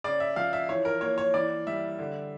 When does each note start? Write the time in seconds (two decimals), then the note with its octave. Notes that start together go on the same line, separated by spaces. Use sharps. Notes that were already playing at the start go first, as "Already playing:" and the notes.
0.04 C#3 D5
0.20 E5
0.36 F3 F5
0.53 E5
0.69 E3 C#5
0.85 A#4
1.01 A#3 C#5
1.18 C#5
1.34 E3 D5
1.67 G3 E5
1.99 D3